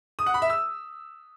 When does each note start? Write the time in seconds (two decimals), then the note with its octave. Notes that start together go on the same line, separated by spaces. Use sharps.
0.19 D#6
0.26 F#5
0.34 B5
0.42 E5
0.50 E6